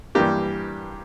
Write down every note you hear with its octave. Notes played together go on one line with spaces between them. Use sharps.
G2 E3 G3 A#3 D4 G4